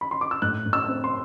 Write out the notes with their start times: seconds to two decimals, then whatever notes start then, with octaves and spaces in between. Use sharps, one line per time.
0.01 B5
0.11 C6
0.21 D6
0.31 E6
0.42 A2 F#6
0.66 A2
0.73 E6
0.88 C4
1.04 C6